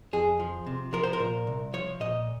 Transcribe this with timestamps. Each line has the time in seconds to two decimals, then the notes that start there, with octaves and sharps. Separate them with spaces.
0.13 F2 G#4
0.40 F3
0.66 C3
0.93 F3 A#4
1.04 C5
1.13 A#4
1.20 A#2
1.47 C2
1.73 F3 C#5
2.00 A#2 D#5